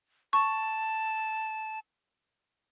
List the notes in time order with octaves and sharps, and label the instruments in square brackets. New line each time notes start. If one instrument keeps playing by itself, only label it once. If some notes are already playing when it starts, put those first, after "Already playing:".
[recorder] A5 [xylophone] C#6